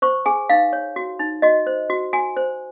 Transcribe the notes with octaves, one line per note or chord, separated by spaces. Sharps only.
C5 C#6
G#4 G#5
D#4 F5
C#5
F#4
D#4
F#4 D#5
C5
F#4
F#4 G#5
C5